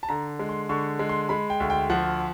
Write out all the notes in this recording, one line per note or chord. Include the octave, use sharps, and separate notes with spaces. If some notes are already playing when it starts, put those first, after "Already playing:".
A5
D3 A#5
G#3
C6
D3 C#6
G#3
C6
G#3 B5
G5
D2
G5
F3 F#5